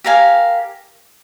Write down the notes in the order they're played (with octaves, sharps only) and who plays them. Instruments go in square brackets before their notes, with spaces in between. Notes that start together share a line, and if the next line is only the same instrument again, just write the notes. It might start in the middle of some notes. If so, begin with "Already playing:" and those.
[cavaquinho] G4 A#4 F5 G#5